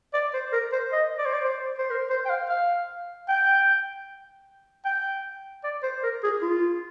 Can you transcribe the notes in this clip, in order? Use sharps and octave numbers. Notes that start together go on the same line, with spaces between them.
D5
C5
A#4
C5
D#5
D5
C5
D5
C5
C5
A#4
C5
G5
F5
F5
G5
G5
D5
C5
A#4
G#4
F4